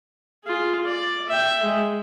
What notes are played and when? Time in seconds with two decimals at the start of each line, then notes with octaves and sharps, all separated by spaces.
0.44 F4 G#4
0.85 D5
1.28 E5 G5
1.63 G#3